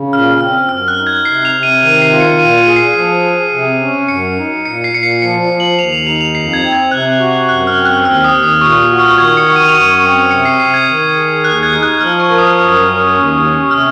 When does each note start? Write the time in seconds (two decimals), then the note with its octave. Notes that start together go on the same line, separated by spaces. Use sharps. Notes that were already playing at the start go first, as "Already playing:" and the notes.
Already playing: C#3
0.13 A#2 F6
0.41 C4 F6
0.69 F#2 F6
0.88 F#6
0.98 D#4
1.07 G#6
1.25 C3 C7
1.45 F7
1.54 C3
1.63 D#7
1.82 D#3 D#7
2.02 C7
2.11 F4
2.20 C#7
2.39 A#2 D#7
2.58 D#7
2.67 G#4
2.76 C7
2.95 F3
3.23 G#4
3.52 C3
3.81 C#4
4.08 F#2 C#7
4.38 D#4
4.65 A#2 C#7
4.84 C7
4.93 A#2 C#7
5.03 C7
5.22 F3 C#7
5.51 F3
5.60 F#7
5.78 D#2 F7
5.93 F7
6.07 D#4 F7
6.21 F7
6.35 F2 C7
6.53 G#6
6.63 C4
6.73 G#6
6.91 C3 F#6
7.19 F#4
7.49 F#2 F#6
7.67 F6
7.77 C4
7.85 F#6
8.05 D#2 F6
8.24 D#6
8.33 D#2
8.43 D#6
8.61 A#2 C#6
8.90 F#4
8.99 F6
9.18 D#3 G#6
9.37 C#7
9.47 F#4
9.56 D#7
9.68 F7
9.74 F#2 D#7
10.03 C4 C#7
10.31 C3 C#7
10.45 C7
10.60 C3 C7
10.74 G#6
10.88 D#3
11.16 G#4
11.44 D#2 F#6
11.63 G#6
11.73 D#4
11.82 F#6
12.00 F3 F6
12.20 C#6
12.30 A#4
12.38 D#6
12.58 F#2
12.86 C#4
13.14 D#2
13.42 C#4
13.71 C3 F6